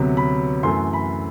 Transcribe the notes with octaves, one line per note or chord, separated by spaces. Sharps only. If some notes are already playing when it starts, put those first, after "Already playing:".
Already playing: D2 C3 F#3 B3
B5
F#2 E3 A3 C6
B5